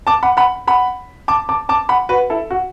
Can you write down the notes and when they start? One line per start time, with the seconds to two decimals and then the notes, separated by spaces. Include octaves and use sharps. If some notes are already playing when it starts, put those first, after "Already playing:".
0.07 A5 D6
0.23 F#5 B5
0.37 F#5 B5
0.67 F#5 B5
1.28 A5 D6
1.49 A5 D6
1.69 A5 D6
1.89 F#5 B5
2.09 F#4 B4
2.30 E4 A4
2.51 F#4